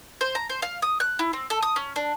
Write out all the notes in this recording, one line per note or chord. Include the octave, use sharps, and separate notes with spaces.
C5
A#5
C5
F5
D#6
F#6
E4
C4
A4
D#6
C#4
D4